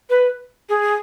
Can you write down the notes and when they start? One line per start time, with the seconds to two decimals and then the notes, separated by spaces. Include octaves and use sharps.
0.10 B4
0.69 G#4